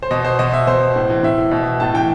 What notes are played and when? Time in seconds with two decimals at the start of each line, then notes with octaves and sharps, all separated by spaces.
0.03 C5
0.11 B2 D#5
0.24 C5
0.39 B2 D#5
0.54 E5
0.67 B2 C5
0.96 A2
1.10 E3
1.23 A2 E5
1.38 E3
1.51 B2
1.80 A2 A5
1.94 E3 G5